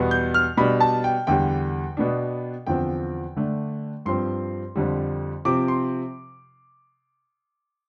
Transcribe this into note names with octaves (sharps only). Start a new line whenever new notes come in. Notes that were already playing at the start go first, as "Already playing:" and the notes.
Already playing: E2 B2 G3 B3
G6
F6
B2 G3 D4 B5
A5
G5
E2 D3 G3 G5
B2 B3 D4
E2 D3 F3 C4 G5
D3 A3 D4
G2 F3 C4 C6
F2 D3 G3
C3 F3 C4 D6
C6